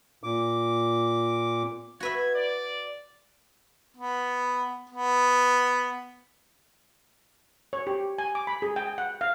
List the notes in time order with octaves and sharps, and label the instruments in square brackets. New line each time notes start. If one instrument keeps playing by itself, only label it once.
[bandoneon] A#2 D6
[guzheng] F#4 B4 E5 [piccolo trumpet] G#6
[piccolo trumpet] D5
[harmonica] B3
B3
[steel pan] C#5
G4
G#5
D6
B5
G#4
G5
F#5
F5